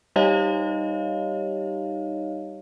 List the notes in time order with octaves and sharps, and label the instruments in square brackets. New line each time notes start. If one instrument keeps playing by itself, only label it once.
[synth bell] G3 D#4 G4 C#5 D#5 F5